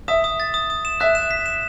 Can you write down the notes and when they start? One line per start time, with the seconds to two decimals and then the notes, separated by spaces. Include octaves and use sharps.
0.08 E5 D#6
0.24 D#6
0.40 A6
0.54 D#6
0.70 D#6
0.85 E7
1.00 E5 F#6
1.15 E7
1.31 B6
1.46 E7